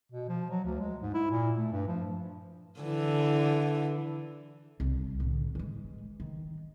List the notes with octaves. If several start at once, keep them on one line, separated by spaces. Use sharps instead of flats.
B2
F3
F#3
D2
G#3
G#2
E4
A#2
A3
G2
F3
D3 E3
C2
A1 D3
E3 G#3
D#3